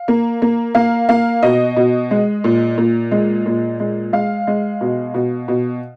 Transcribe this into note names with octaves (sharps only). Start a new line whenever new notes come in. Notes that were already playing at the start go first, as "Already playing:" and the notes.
Already playing: F5
A#3
A#3
A#3 F5
A#3 F5
B2 D#5
B2
G#3
A#2
A#2
G#3
A#2
G#3
G#3 F5
G#3
B2
B2
B2